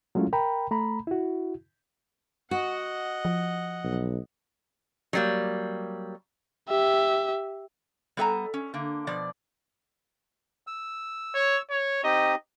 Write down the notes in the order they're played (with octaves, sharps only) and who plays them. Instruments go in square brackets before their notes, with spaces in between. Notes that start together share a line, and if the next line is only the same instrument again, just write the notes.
[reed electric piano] F#3 G#3 A3 C#4 E4 F4
A#4 G5 A#5 B5
A3 A#5 B5
E4 F#4
[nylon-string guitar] F#4 [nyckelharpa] D#5 F#5
[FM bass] F3
[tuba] B1
[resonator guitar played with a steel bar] F#3 G3 A#3
[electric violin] G4 E5
[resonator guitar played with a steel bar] G3 B3 A4 E5 G#5 A#5
C#4
D3 A#3
B2 F3 D5
[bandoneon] E6
[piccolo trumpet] C#5
C#5
[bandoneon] C4 D#4 G4 [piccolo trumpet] D#5